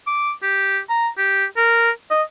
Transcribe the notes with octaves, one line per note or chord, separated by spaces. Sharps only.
D6
G4
A#5
G4
A#4
D#5